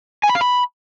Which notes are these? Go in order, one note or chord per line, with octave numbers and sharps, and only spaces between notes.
G#5
B5
F5
B5